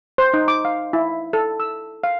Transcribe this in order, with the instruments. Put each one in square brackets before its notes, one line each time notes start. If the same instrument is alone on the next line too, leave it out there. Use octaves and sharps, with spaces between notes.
[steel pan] C5
D#4
D6
F5
E4
A4
E6
F5